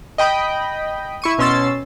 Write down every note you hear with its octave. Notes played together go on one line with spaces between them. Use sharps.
D#5 G5 B5
E4 C#6 D#7
B2 C#4 C6 E6 A6